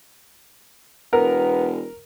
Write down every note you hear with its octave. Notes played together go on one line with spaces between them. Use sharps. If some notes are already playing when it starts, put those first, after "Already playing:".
E1 B3 A#4